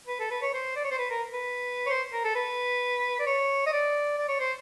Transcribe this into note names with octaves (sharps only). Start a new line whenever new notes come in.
B4
A4
B4
C#5
C5
D5
C#5
C5
B4
A#4
B4
C#5
C5
A#4
A4
B4
D5
C#5
D#5
D5
D5
C#5
C5